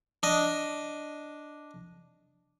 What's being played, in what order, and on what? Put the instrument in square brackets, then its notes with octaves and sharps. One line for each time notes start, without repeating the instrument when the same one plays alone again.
[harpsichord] D4 D#5